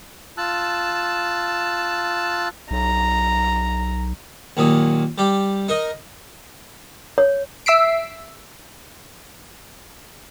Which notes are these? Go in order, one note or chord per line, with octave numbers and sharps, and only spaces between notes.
F4 A5 E6 F#6
B1 A#5
D#2 A#2 F#3 D#6
G3 G4
D#4 A#4 D#5
C#5
E5 E6 B6 C7 D7